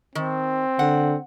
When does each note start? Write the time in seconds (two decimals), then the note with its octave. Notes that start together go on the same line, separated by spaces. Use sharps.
0.15 D#3 C4
0.79 D3 F#5